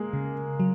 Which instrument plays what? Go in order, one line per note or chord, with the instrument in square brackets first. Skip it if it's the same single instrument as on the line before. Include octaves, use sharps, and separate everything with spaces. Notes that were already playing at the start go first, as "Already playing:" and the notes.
Already playing: [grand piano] G#3 A#3
[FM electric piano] C#3
F#3